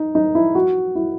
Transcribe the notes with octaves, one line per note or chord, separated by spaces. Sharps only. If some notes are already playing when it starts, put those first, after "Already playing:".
Already playing: D#4
D#4
E4
F#4
E4